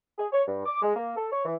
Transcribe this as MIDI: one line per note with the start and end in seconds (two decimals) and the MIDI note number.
0.18 0.27 68
0.32 0.43 73
0.48 0.62 43
0.66 0.79 86
0.82 0.95 56
0.96 1.15 58
1.17 1.28 69
1.32 1.45 73
1.45 1.54 52